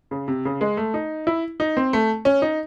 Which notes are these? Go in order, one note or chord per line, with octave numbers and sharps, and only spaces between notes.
C#3
C3
C#3
G#3
A3
D#4
E4
D#4
C4
A3
C#4
D#4